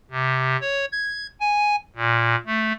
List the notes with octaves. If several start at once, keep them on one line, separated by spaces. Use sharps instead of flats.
C3
C#5
G#6
G#5
A#2
A3